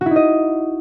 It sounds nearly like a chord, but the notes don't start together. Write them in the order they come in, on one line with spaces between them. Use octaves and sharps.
F#4 E4 D#4 D#5